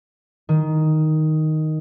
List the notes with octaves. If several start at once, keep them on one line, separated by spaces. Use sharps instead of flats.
D#3